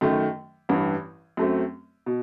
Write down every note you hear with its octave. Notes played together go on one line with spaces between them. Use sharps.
F#2 D#3 A3
A1 G2 E3
F#2 F#3 A3 C4
B2